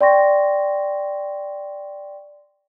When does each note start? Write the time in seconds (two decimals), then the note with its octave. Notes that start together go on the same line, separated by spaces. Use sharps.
0.01 D5 G5 C6 C#6 A#6